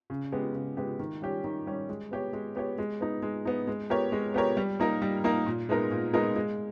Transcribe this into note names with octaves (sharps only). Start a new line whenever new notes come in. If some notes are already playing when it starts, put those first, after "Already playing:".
C#3
G#3 B3 G4
C#3
G#3 B3 G4
D#3
G3 C#4 G4
D#3
G3 C#4 G4
G#3
B3 G4 C#5
G#3
B3 G4 C#5
G#3
B3 D#4
G#3
B3 D#4
G#3
B3 G4 A#4 C#5
G#3
B3 G4 A#4 C#5
G3
A#3 D#4 A#4
G3
A#3 D#4 A#4
A#2
G#3 B3 D#4 A#4
A#2
G#3 B3 D#4 A#4
G#3